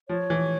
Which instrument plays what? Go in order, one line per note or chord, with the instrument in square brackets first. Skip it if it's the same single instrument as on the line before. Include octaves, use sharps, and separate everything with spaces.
[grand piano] F3 [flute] C#5
[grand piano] E3